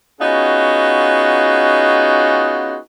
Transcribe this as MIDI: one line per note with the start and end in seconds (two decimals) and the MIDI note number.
0.21 2.77 59
0.21 2.77 61
0.21 2.77 63
0.21 2.77 65
0.21 2.77 66
0.21 2.77 68